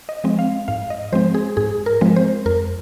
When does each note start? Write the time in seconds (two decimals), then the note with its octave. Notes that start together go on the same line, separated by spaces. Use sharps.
0.09 D#5
0.24 F3 G#3 C4
0.39 F5
0.68 G#2 F5
0.90 D#5
1.13 F3 G#3 C4 C5
1.34 G#4
1.57 G#2 G#4
1.86 A#4
2.01 F3 G#3 C4
2.16 C5
2.46 F2 A#4